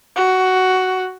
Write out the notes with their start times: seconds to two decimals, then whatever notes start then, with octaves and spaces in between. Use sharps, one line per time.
0.16 F#4